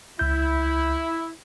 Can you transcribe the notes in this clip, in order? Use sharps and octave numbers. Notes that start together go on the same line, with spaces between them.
C#2 E4 G6